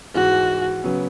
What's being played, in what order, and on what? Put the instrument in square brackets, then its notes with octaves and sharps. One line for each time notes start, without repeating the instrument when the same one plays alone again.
[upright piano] G#2 E3 G#3 [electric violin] F#4
[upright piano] C#3 F#3 B3